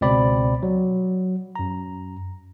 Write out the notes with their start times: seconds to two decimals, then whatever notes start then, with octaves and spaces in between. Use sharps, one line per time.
0.01 C#2 B2 C4 D5 B5
0.63 F#3
1.56 F#2 A#5